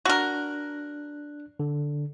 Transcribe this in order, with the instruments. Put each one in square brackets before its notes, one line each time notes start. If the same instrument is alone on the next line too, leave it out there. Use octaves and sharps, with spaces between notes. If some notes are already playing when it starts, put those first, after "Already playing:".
[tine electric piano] D4 F#6 [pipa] F#4 A#4
[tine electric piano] D3